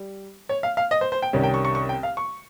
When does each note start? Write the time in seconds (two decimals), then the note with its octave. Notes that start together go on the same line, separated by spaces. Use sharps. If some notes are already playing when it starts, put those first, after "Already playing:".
Already playing: G3
0.49 C#5
0.63 F5
0.77 F5
0.91 D#5
1.01 C5
1.12 C5
1.22 G5
1.33 C2 C3 D#3 G3 C#4
1.43 G5
1.54 C#6
1.65 C#6
1.75 C#6
1.89 G5
2.03 F5
2.17 C#6